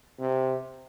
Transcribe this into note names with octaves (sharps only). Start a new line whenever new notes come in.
C3